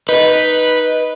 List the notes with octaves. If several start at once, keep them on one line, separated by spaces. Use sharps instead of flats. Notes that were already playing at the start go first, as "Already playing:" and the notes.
D#4 B4